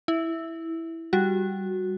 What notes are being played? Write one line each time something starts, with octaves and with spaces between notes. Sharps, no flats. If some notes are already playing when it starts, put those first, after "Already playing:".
E4
G3 F#4